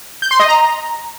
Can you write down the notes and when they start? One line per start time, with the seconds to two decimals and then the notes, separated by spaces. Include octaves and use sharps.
0.22 G6
0.31 C6
0.40 D#5
0.48 A#5